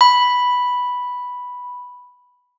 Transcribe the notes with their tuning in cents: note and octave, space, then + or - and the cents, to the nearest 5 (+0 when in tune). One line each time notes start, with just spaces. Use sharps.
B5 +0